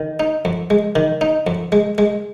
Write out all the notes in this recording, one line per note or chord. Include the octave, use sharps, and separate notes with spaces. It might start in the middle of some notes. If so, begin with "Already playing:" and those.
Already playing: D#3
D#4
F2
G#3
D#3
D#4
F2
G#3
G#3